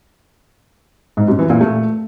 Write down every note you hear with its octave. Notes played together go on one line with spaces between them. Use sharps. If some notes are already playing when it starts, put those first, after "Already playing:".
G#2
F#2
E3
A#2
A3